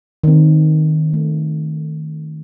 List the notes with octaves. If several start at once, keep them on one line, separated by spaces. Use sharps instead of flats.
D#3 C4
A3